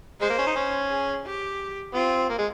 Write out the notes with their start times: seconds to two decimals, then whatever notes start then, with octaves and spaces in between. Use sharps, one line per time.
0.20 G#3 C5
0.30 A#3
0.38 C#4
0.47 D#4
0.56 C#4
0.90 G#4
1.25 G4
1.94 C4 F4
2.29 A#3
2.39 G#3